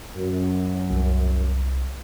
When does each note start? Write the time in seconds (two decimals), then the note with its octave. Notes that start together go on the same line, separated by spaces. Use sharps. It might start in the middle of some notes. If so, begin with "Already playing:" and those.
0.15 F#2
0.90 C2